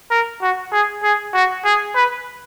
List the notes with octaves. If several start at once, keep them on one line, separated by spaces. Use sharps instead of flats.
A#4
F#4
G#4
G#4
F#4
G#4
B4